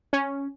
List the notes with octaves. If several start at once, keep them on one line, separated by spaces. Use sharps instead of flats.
C#4